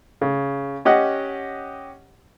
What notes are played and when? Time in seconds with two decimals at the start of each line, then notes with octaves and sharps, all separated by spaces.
0.21 C#3
0.85 C#4 G4 D#5 F#5